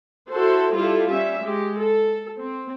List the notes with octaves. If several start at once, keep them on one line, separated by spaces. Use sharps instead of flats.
E4 F#4 A4 C5
G3 E4 F4 G4 A4
G3 C#4 E5
G#3 G4
A4
C4